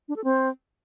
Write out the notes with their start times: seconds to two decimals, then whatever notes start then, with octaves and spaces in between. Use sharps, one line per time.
0.08 D4
0.16 A4
0.24 C4